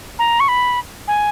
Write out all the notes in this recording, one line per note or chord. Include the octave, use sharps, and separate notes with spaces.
A#5
C#6
B5
G#5